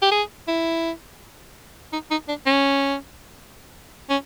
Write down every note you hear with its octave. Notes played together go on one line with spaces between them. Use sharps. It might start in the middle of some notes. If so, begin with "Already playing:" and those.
G4
G#4
E4
D#4
D#4
D4
C#4
C#4